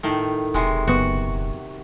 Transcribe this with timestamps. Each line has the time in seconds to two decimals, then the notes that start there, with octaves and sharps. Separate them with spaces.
0.03 A2 D#3
0.54 E1 C3 G#3
0.88 F#1 B3 F#4